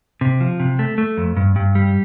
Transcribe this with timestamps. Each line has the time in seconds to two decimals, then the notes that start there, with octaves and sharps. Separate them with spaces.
0.21 C3
0.40 F3
0.60 C3
0.79 A3
0.98 A3
1.17 F2
1.37 G2
1.56 G2
1.75 G3